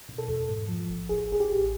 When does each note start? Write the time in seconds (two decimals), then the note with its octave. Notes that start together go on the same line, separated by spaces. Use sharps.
0.09 B2
0.18 A4
0.28 E2
0.49 G#2
0.69 F3
0.89 A1
1.09 A1 G#4
1.30 A1 G#4
1.40 G4
1.50 A1